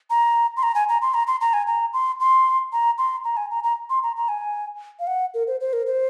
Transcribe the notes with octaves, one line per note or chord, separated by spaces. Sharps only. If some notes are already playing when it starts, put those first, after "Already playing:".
A#5
C6
A#5
G#5
A#5
C6
A#5
C6
A#5
G#5
A#5
C6
C6
A#5
C6
A#5
G#5
A#5
A#5
C6
A#5
A#5
G#5
F5
F#5
A#4
C5
C5
A#4
C5